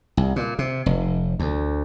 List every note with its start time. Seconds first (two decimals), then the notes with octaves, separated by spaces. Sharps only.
0.17 C2
0.36 A#2
0.59 C3
0.86 F1
1.39 D2